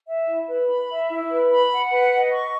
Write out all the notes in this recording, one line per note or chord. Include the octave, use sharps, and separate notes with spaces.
E5
E4
B4
B5
E5
E4
B4
B5
F#5
B4
D#5
C#6